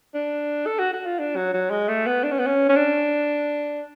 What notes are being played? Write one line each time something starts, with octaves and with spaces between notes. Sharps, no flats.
D4
A4
F#4
F#4
F4
D4
F#3
F#3
G#3
A3
B3
D4
C#4
B3
C#4
C#4
D4